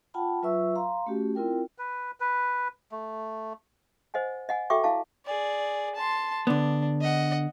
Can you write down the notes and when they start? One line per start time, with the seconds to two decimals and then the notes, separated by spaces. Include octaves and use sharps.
0.14 F4 F#5 G5 A5 B5
0.42 F#3 F4 B4 E5 C#6 E6
0.76 F5 A#5 C6
1.06 A3 C#4 F#4 G4
1.35 C4 E4 F4 A#4 G5
1.78 B4
2.20 B4
2.92 A3
4.14 C5 D#5 F#5 G#5
4.49 D#5 F#5 G#5
4.70 F#4 A4 E5 G5 C#6 D6
4.84 E4 F5 A5
5.26 G#4 D5
5.95 A5 C6
6.47 D3 B3 D4
7.01 D#5 F#5